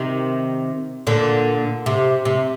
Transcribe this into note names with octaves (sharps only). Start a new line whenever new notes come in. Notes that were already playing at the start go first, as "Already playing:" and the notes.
Already playing: C3 D#3
A#2 D3
C3
C3